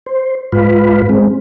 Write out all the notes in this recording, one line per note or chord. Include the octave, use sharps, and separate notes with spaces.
C5
G#2 F4 B4
G#3 C4